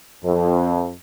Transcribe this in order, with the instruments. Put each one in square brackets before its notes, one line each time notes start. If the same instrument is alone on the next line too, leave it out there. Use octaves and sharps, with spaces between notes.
[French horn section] F2